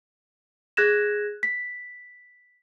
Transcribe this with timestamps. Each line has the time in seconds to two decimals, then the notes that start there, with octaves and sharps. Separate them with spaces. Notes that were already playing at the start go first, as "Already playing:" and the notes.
0.77 G#4 F#6 G#6 A#6 E7
1.43 B6